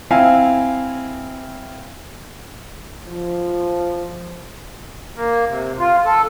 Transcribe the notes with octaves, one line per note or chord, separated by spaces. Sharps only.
C4 E4 F5 G#5
F3
A#3
C3
F4
A4